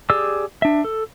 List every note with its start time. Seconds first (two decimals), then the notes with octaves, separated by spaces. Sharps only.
0.10 G4 G#4 D5 E6
0.62 D4 E5
0.84 A4